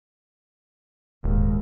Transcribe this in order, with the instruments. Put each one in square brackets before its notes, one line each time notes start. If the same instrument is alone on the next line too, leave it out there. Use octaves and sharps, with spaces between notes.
[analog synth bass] D#1 [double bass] D#2 G#2